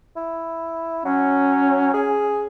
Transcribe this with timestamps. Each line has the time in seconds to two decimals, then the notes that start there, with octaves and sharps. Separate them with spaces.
0.16 E4
1.05 F#3 C#4
1.94 G#4